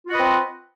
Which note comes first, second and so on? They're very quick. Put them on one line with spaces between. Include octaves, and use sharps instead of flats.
F4 F#4 D#5 B4 C4